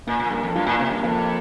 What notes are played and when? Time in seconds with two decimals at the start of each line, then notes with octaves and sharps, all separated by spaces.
0.07 A#2 A#3
0.19 A#2
0.30 G2 A#4
0.43 F2
0.55 G2 F4
0.67 A#2
0.79 C3 A#3
0.91 G2
1.03 F2 A#3